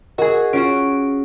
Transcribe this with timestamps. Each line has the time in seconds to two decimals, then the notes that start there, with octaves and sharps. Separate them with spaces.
0.18 F#4 G#4 A#4 D#5
0.53 C#4 F4 F#4 D7